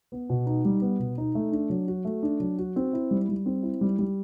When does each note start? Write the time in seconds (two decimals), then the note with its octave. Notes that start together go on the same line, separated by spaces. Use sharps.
0.12 B3
0.29 B2
0.46 D#4
0.65 G3
0.82 B3
0.99 B2
1.18 D#4
1.35 A3
1.52 D4
1.70 F#3
1.88 F#4
2.05 A3
2.23 D4
2.40 F#3
2.58 F#4
2.76 C4
2.93 E4
3.11 G3
3.29 G3
3.46 C4
3.63 E4
3.81 G3
3.99 G3